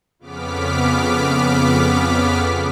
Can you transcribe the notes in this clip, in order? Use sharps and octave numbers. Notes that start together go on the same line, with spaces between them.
F2 C#3 B3 D6 F6 B6